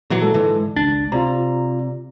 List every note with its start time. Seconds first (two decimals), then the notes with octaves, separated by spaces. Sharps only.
0.10 A#2 E3 F#3
0.22 G#3 A4
0.34 G#2 D3 E3
0.76 G#1 C#2 D4 A6
1.12 C3 F4 D5 A#5